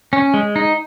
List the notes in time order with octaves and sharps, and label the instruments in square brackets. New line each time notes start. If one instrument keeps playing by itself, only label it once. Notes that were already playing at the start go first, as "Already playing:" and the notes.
[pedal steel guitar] C#4
G#3
D#4